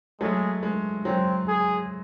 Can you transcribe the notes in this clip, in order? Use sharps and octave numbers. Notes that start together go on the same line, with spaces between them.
F#3 G#3 A3
G#3
F#3 C4
G#4